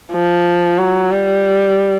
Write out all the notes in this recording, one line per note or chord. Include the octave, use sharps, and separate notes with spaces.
F3
F#3
G3